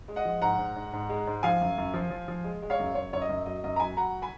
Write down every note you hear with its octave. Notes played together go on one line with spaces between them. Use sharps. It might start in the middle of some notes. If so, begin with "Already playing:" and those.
G#3
D#5 F#5
F3
G#2 F#5 A#5
G#2
G#2
G#2
G#3
G#2
F3 F5 G#5
F#2
F#2
F3
F3
F3
G#3
G#3
C#5 F5
F#2
F#2 C#5
F#2 C#5
D#5
F#2
F#3 D#5
F#2 D#5
A#5
F#3 G#5 B5
F#3 F#5 A#5
G#5 B5